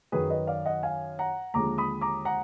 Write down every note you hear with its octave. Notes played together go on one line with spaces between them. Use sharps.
F#2 D#3 F#3 G#4 B4
B4 D#5
D5 F5
D#5 F#5
F5 G#5
F#5 A#5
D#2 D3 F3 G#3 A#5 D6
B5 D#6
A#5 D6
F#5 A#5